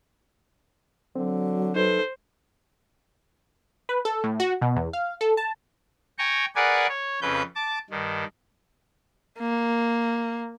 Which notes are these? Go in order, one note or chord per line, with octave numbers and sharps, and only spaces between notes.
D3 F#3 C4
D#4 A4 B4 C5
B4
A4
A2
F#4
B2
E2
F5
A4
A5
G5 G#5 A#5 C#6
G#4 A#4 B4 D5 F#5 G#5
C#5
F2 C#3 B4 G6
A5 D6
G2 D#3
A#3